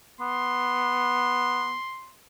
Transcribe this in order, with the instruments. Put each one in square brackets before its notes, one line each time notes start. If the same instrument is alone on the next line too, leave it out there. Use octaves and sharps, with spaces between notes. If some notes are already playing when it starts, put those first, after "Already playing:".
[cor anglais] B3 [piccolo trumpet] C6